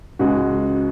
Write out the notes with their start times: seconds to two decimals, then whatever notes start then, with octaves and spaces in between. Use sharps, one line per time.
0.19 C#2 C#3 G#3 F#4